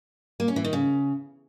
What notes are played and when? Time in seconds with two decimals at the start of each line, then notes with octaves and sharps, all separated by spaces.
0.40 A#3
0.48 C#4
0.56 E3
0.64 D#3
0.73 C#3